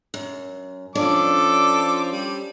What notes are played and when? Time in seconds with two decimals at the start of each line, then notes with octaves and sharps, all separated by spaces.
0.14 F#2
0.95 F3 C#4 D4 A4 D5 D6
2.12 G3